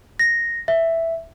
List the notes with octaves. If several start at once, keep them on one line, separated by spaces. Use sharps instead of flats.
A#6
E5